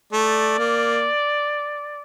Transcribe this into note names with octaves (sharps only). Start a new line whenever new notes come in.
A3 D5
A#3